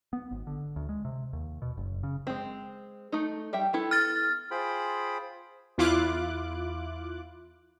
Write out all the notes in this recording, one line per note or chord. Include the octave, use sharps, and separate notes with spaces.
B3
G#1
D3
D2
G#3
C3
D#2
B2
F#1
C#3
G#3 C4
A3 D#4
G3 E5 G5
B3 E4 A4
F6 A6
F4 G#4 C5 G5 B5
E2 E4 F4 D6 F#6